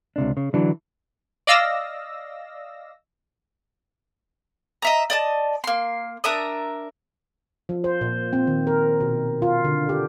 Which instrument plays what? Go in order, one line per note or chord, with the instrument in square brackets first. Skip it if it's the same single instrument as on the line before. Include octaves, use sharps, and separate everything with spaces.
[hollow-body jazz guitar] C#2 C3 D4
C#3
D3 E3 F#3 D4
[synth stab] D5 D#5 F5 E6 A#6
[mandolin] D#5 E5 A#5
D5 D#5 A5
A#3 C6
D4 A#4 E5 D#6
[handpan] F3
C5
A#2
C4
D#3
A#4
B2
F4
D3
G4